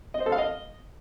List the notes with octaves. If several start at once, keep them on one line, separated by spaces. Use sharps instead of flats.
D#5
C5
A4
F5
D#5